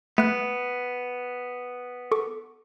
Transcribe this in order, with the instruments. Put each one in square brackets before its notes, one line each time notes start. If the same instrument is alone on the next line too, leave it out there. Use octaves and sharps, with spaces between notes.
[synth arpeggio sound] A3 F#6 [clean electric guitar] B3
[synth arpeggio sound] A4 C#6 D6